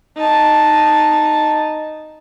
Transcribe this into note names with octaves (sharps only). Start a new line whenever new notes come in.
D#4 A5